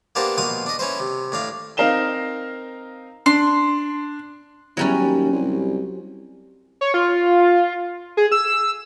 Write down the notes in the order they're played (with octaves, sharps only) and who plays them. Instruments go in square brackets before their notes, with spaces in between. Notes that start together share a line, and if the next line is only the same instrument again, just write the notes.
[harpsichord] A#3 B3 D4 G4 C5 A5
A#1 B2 F5 C6 D#6
D4 D#5
C#4 E4 B4 C5
C3
A2 D4 F5
[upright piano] C4 D#4 A#4 F5 E7 G7
[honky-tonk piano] D4 [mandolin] C6
[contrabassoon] E2 [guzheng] F#3 G3 C#4
[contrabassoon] D#2
C2
[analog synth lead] C#5
F4
G#4
E6